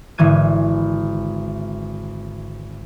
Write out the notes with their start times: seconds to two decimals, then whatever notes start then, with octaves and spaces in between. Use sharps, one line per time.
0.18 G#1 D3 E3 G#6 D#7